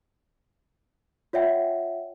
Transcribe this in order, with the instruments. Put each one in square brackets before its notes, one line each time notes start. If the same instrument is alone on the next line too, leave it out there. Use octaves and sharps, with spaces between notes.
[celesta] F4 C#5 D5 E5 F#5 G5